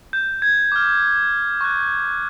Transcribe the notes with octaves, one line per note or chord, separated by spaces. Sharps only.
G6
G#6
D6 F6
C#6 F#6